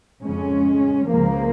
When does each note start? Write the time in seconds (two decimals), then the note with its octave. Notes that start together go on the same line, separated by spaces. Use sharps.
0.23 F2 C#3 G#3 C#4
1.09 C#2 C#3 F3 A#3